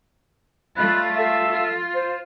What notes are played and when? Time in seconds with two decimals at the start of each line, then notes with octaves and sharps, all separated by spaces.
0.77 G3 A3 F4 D#5 B5 F#6
1.15 A4 E5 F5
1.49 F4
1.94 C5